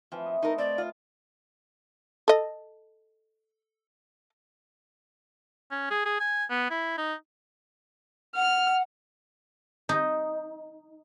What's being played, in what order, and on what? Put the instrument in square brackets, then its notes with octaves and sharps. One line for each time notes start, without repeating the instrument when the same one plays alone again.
[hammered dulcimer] E3 C4 [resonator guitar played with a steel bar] F3
[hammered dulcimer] E4 D#5
[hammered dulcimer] A3 [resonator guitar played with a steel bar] D#4 A#4
[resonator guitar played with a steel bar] C4 [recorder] D5
[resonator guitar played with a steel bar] F4
[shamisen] A4 D#5
[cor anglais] C#4
G#4
G#4
G#5
B3
E4
D#4
[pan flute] F#5 [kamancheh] F6
[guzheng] D#4